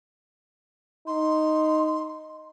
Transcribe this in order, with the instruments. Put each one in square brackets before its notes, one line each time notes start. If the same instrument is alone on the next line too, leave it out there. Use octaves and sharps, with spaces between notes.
[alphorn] D#4 [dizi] C6